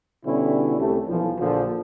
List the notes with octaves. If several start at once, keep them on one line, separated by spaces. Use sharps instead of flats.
B2 D3 G3 C#4 E4
C2 G3 A3
B1 E3 F3
A#1 A#2 D3 F3